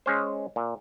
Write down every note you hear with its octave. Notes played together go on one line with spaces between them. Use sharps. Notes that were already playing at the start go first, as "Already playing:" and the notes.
G#3 C#4 C5
A#2